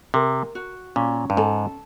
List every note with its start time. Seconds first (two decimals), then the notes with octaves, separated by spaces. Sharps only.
0.14 C3 A#4
0.55 F#4
0.96 A#2 C#4
1.30 G2
1.37 G#2 A4